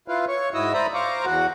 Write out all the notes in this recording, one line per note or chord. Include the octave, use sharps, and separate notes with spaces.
E4 F4 B4 F5
C#5 C#6
G#2 E4 F#4 D#5 D#6 E6
C5 D5 E5 A#5 B5 D#6
C5 F5 A#5 C#6 D6
E2 F#4 F#5